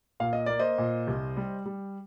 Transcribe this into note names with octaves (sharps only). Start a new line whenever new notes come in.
A#2 F5
D#5
A#3 D5
C5 D#5
A#2
C2
G3
G3